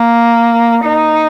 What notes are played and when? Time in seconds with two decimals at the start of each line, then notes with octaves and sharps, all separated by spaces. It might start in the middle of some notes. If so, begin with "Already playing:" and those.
Already playing: A#3
0.85 D#4